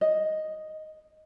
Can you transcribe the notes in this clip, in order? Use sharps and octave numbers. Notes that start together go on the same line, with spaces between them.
D#5